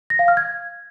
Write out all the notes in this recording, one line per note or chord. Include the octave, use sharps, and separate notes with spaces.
A#6
F5
F6
G#6